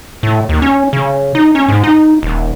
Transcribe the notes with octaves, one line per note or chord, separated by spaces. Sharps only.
A2
D#2
C#4
C#3
D#4
C#4
G#2
D#4
D#1